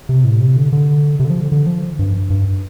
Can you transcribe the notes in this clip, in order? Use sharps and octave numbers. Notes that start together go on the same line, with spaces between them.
C3
A2
C3
D3
D3
C3
D3
F3
D3
D3
F3
G2
G2